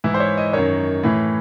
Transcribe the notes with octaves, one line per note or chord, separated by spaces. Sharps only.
G#2 E3 E4
C5
C#5
D#5
F#2 D#3 C#5
A2 E3